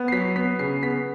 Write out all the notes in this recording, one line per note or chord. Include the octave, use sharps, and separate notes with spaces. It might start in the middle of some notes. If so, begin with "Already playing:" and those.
Already playing: B3
C7
F#3 B6
B3 B6
C#3 C7
B3 B6